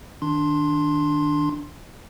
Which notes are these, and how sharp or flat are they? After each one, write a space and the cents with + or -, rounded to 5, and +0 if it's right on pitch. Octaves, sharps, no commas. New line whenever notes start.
D#3 +0 D4 +0 C6 +10